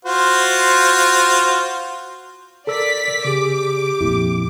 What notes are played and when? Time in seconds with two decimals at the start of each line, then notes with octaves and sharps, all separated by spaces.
0.05 F4 F#4 C5
2.67 A4 A#4 D5 E6 B6
3.25 C#3 G4 G#4 D6
4.01 F2 A#2 E4